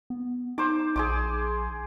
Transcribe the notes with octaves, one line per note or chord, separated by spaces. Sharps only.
B3
D#4 C5 D6
A#1 G#4 C6 D6